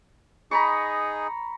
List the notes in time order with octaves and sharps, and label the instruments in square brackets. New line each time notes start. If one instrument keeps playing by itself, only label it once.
[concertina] D#4 G#4 [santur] A#5 B5 C#6